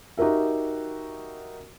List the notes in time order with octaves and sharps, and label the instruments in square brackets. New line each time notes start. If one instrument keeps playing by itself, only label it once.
[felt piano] D#4 F#4 G4 A#4 E5